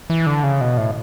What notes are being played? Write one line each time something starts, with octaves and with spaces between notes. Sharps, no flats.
E3
D3
C#3
B2
A2